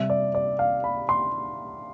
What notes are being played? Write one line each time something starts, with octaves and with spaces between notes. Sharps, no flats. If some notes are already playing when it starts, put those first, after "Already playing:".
Already playing: C3 G3 E5
D5
D5
F5
B5
C6